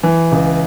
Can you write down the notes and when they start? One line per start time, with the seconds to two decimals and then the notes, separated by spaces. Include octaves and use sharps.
0.03 E3
0.32 C#2